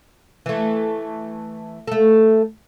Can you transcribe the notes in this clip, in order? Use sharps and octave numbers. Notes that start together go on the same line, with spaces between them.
E3 A3
A3 A4